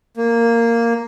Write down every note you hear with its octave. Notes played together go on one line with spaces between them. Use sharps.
A#3